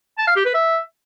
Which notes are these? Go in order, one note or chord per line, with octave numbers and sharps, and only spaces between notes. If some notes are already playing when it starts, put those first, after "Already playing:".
A5
F5
G4
B4
E5